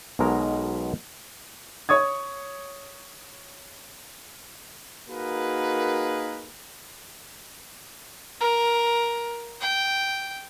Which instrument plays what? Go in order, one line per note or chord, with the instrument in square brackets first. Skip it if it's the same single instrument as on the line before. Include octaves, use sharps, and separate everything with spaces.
[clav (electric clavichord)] B1 B2 G#3 A#4 A#5
[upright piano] C#5 C#6 D#6 G#6
[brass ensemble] A#3 D#4 F#4 G#4 A#4 B4
[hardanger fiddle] A#4
G5